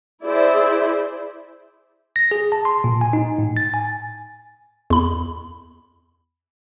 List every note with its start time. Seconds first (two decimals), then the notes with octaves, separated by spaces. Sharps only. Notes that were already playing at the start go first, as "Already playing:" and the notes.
0.24 E4 G#4 C5 D5 E5
2.16 A#6
2.31 G#4
2.52 A5
2.65 C6
2.84 A#2
3.01 G#5
3.13 D#4
3.39 A2
3.57 A6
3.74 G#5
4.90 E2 B5